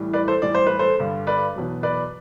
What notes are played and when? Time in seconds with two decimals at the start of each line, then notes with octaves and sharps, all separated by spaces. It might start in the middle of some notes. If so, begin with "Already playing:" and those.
Already playing: A2 E3 G3
0.13 B4 D5
0.28 A4 C5
0.42 A2 E3 G3 D5
0.55 C5
0.67 B4
0.79 A4 C5
0.99 G2 D3 G3
1.27 B4 D5
1.55 E2 B2 F#3
1.83 B4 D5